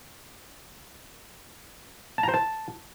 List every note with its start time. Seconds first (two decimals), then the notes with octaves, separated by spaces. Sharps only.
2.18 A5
2.23 A#5
2.28 C5
2.34 A5